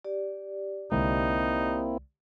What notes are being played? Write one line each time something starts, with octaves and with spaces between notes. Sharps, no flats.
G4 D5
C2 D3 G#3 A#3 C4 D#4 E4